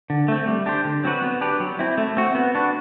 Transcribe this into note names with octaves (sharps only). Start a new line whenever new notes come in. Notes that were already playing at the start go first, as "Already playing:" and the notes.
D3
A3 C4
G3
D4 G4 C5
D3
F#3 C4 F#4 B4
B3
D4 G4 B4
F#3
C4 E4
A3
C4 F#4
B3
D4 F#4 B4